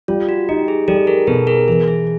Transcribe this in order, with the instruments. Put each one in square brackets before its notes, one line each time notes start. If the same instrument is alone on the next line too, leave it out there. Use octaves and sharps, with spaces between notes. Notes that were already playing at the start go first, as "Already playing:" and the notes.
[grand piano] G3 [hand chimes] F4
[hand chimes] F#4
[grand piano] D#4 [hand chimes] G4
[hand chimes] G#4
[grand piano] G3 [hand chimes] G4 A4
[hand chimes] G#4 A#4
[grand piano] B2 [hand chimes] A4 B4
[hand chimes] G#4 A#4
[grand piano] E3 [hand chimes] G#4
[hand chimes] G#4